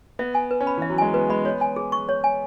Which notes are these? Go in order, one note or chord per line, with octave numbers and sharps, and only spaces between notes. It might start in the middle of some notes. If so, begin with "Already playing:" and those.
B3 E5
G#5
B4
C#4
B5
E3 E5
F#3
G#3 G#5
B3 B4
G#3 B5
B3 C#5
G#5
G#4
C#6
C#5
G#5